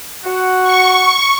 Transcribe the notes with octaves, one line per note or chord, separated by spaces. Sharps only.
F#4 F#5
C#6